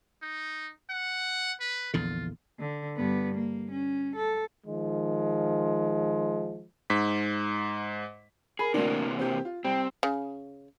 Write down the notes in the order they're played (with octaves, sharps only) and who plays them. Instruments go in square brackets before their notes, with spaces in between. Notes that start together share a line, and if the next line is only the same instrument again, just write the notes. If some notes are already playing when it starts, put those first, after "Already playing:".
[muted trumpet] D#4
F#5
B4
[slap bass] A#1 E2 D3 [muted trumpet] F4
[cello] D3
G2 B3
A#3
C#4
A4
[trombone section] D#3 F3 G#3
[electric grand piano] G#2 B6
[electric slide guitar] G#4 [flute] A#4 [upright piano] B5
[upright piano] D2 D4 [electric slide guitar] C3 E3 A#3
[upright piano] C4 G4
F4
[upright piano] C2 [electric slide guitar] C4 [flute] G5
[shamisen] C#3